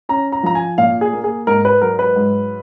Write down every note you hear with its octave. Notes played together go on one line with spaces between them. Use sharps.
C#4 A#5
A#5
F3 A#5
G#5
A#2 F5
G#4
A#3
G#4
G#2 A#4
B4
F#3 A#4
B4
G#2